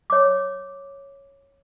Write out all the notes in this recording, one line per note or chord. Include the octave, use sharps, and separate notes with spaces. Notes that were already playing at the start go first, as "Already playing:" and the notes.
C#5 D6